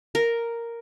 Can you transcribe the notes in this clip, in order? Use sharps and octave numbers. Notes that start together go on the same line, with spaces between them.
A#4